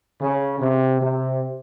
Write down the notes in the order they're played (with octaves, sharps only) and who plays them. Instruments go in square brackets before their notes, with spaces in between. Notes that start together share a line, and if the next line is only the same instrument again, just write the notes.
[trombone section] C#3
C3
C3